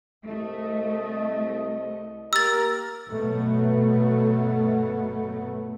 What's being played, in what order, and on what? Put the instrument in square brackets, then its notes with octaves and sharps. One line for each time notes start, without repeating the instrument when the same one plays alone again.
[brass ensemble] C2 D#5 [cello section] A3
[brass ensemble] A#3 G4 A#4 [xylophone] E6 A6
[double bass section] G1 B2 F#3 A3 B3